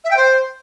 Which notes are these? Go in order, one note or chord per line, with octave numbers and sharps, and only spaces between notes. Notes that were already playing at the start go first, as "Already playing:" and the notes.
E5
G5
C5